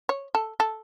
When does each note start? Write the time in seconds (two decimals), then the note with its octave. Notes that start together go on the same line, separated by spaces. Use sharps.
0.09 C#5
0.35 A4
0.60 A4